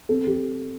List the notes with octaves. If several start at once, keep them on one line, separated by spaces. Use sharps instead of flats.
C4 A4
G4